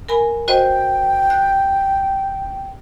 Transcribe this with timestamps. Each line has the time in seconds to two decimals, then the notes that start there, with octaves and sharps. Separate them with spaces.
0.09 A#4 G#5 B5
0.48 F#4 C5 D#5 G5
1.30 F#6